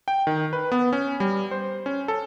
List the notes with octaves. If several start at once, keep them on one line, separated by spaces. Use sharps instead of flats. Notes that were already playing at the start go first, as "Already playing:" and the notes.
G5
D#3
B4
B3
C#4
G3
C5
C#4
A4